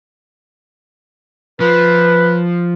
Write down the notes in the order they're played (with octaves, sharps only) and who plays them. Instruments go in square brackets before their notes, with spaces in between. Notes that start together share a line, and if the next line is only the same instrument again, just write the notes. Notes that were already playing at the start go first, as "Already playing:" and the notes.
[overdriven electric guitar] F3 [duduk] B4